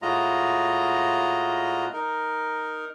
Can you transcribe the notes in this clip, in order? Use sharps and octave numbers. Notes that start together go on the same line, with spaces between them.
A2 G#3 F4 F#4 D#5 A#5
D#4 A#4